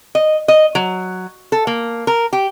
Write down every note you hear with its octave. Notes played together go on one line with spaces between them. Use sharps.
D#5
D#5
F#3
A4
A#3
A#4
G4